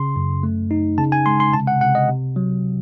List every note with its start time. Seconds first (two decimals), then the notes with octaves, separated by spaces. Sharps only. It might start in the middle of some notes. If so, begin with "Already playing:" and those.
Already playing: C#3 C6
0.16 F#2
0.43 A3
0.71 D#4
0.98 C#3 A5
1.12 G#5
1.26 G#3 C6
1.40 C6
1.53 C3 A5
1.67 F#5
1.81 C3 F#5
1.95 D#5
2.09 C3
2.36 F#3